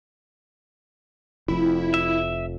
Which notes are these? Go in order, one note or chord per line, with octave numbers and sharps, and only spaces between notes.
F1 F2 E4
E5